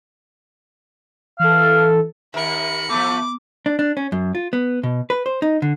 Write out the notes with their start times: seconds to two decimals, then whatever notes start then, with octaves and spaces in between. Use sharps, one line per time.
1.40 E3 A4 F5
2.34 D#2 A#4 E5 B5 C#7
2.90 F3 A3 B3 D6
3.66 D4
3.79 D4
3.97 C#4
4.12 F#2
4.35 F4
4.53 B3
4.83 B2
5.10 B4
5.26 C5
5.42 D#4
5.62 D3